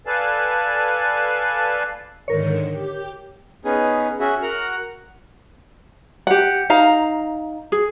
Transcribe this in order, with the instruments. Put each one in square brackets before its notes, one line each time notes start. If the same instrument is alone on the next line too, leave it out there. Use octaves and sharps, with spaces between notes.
[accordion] A4 B4 D5 F5 G#5 A5
[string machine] G#2 D3 D#3 [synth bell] A#4 C#5
[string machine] G4
[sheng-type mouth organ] B3 C#4 D#4 G#4
C#4 F#4 G#4 E5
F#4 A#4 F#5 F6
[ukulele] G4 F#5
D#4 F5 A#5
G#4